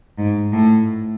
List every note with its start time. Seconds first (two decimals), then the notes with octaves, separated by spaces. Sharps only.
0.18 G#2
0.52 A2